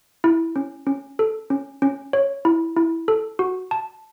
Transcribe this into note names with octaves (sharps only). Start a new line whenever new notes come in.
E4
C#4
C#4
A4
C#4
C#4
C#5
E4
E4
A4
F#4
A5